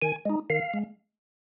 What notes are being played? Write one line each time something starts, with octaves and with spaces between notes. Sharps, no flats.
D#3 G#5
G#3 D#4
D#3 F5
G#3